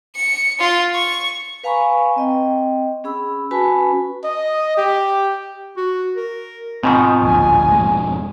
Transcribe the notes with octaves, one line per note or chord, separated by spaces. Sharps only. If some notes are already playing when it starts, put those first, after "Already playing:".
C#7
F4
C#6
B4 F5 G#5 A#5 B5 C#6
C4 D#5 G5
C#4 G#4 B5 E6
C#4 F#4 B4 G#5 A5 B5
D#5
G4
F#4
A#4
G#2 B2 D#3 C4 F4
D1 A#1 G#5
E1 F2 G#3